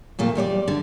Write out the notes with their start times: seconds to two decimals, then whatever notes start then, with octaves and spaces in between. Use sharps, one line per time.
0.19 F2 A#2 A3
0.35 E2 G3 C#5 D5
0.68 D3